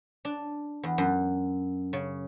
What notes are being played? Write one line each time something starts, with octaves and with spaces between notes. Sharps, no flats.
D4
E2
F#2
C#3